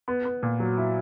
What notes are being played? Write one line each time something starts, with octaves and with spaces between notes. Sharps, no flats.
B3
B3
A#2
F#3
E4